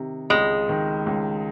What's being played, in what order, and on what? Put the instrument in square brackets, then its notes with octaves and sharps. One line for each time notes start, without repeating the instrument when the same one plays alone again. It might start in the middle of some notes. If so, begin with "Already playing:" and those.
Already playing: [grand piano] C3 D#3
[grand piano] C#2 [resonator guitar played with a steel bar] G#3
[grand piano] D#3
C#2